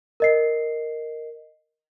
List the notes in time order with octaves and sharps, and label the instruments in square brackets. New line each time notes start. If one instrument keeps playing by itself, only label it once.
[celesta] A#4 D#5 C7